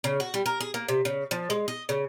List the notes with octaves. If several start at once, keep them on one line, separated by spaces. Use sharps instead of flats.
C#3
F#4
G3
A#4
G#4
A#3
C3
C#3
F3
G#3
D#5
C#3